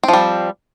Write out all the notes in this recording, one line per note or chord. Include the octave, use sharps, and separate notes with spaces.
F3 G3 C4